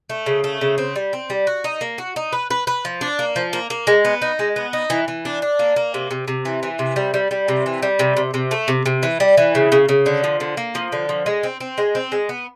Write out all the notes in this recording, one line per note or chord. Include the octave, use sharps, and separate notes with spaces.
A3
C#3
A3
C#3
C4
G3
C4
G3
F#4
D#4
A#3
F#4
D#4
B4
B4
B4
F3
D4
A#3
F3
A#3
A#3
G#3
B3
D#4
G#3
B3
D#4
E3
E3
D4
D4
A#3
A#3
C3
C3
C3
E3
E3
C3
G3
G3
G3
C3
E3
G3
C3
C3
C3
A3
C3
C3
E3
G3
E3
C#3
C#3
C#3
D3
F3
D3
A#3
F3
D3
F3
G#3
C4
C4
G#3
C4
G#3
B3